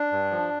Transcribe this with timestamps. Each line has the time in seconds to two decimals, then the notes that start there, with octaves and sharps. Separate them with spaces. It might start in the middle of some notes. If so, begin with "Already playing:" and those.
Already playing: D4
0.12 G2
0.31 F3